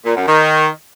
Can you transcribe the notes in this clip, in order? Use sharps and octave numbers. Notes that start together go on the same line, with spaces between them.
A#2
F#2
D#3